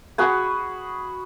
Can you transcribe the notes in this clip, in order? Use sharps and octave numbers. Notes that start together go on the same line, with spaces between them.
F#4 G#4 B4 G#5